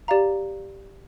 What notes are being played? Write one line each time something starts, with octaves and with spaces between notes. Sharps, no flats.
G4 D5 F5 A#5